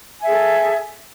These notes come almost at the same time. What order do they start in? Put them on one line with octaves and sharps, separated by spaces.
G#5 E5 G#4 A4